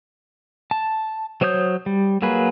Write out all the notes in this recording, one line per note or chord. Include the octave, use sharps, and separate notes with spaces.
A5
F#3 C5 C#5 D#6 G6
G3
F#3 A#3 G#4 B4